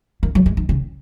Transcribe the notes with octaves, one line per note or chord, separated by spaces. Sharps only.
A#3
F#3
G#3
D#3
C#3